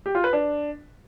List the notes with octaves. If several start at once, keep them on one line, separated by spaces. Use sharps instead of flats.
G4
F4
B4
D4